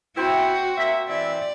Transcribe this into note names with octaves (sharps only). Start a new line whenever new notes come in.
C4 E4 F#4 C5 G5
A#3 E5
E3 C4 D5 E5